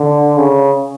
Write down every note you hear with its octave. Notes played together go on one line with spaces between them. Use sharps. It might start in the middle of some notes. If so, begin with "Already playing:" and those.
Already playing: D3
C#3